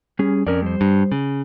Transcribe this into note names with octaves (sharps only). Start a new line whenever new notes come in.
G3 C#4 G#4
F2 C#4 A#4 D5
G3 C5
G2
C#3